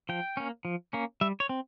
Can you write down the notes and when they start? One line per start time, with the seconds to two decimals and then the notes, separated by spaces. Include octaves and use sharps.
0.09 F3 G5
0.37 A#3 C#4
0.65 F3
0.93 A#3 C#4
1.21 G3 E5
1.40 C#5
1.49 C4